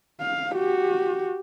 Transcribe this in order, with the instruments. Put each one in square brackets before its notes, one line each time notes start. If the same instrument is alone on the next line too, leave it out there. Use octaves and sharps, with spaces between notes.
[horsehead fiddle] F5
F#4 G4